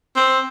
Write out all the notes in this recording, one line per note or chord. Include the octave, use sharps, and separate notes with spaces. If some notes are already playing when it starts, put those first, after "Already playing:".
C4